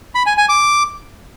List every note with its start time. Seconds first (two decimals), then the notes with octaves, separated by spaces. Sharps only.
0.15 B5
0.26 G#5
0.38 G#5
0.49 D6